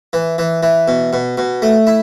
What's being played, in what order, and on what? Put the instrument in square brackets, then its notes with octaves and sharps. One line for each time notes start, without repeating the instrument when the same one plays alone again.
[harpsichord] E3
E3
E3
B2
B2
B2
A3
E4